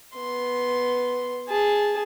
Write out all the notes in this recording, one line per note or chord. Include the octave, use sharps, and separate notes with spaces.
B3 C6
G#4 A5